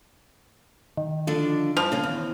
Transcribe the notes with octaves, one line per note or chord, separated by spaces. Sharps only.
D#3
D3 F3 D4
G2 F3
C#3 C#4
E2